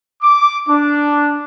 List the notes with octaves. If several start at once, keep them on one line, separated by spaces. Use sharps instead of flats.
D6
D4